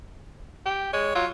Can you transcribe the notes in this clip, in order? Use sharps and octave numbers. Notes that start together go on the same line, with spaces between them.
G4
G#3 C#5
F#3 F4